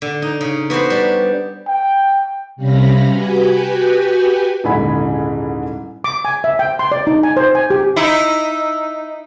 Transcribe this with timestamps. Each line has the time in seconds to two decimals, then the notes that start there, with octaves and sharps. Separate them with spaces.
0.02 D3
0.22 D#4
0.41 C#3
0.70 B3 F#4 G4 C5
0.90 G3 D4
1.68 G5
2.56 C3 G3 C#4 F5 B5 A#6
3.08 F#4 G4 B4 G5 G#5
4.64 D#1 G#2 D3 E4 G#5 B5
6.04 D6
6.25 G#5
6.44 E5
6.59 G5
6.79 C6
6.92 D5
7.07 D#4
7.23 G#5
7.37 C5
7.55 G#5
7.70 G4
7.96 D#4 E4